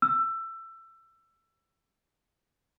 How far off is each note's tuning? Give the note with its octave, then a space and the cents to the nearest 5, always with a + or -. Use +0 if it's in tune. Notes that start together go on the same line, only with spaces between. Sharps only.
E6 +20